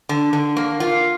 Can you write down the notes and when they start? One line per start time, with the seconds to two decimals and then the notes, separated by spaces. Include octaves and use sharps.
0.09 D3
0.33 D3
0.57 A#3
0.80 F4